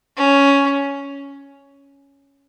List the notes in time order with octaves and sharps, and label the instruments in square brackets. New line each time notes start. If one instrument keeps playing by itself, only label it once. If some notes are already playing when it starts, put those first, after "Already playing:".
[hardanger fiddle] C#4